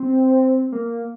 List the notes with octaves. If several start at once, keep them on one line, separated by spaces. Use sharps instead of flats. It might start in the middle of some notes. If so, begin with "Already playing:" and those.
Already playing: C4
A#3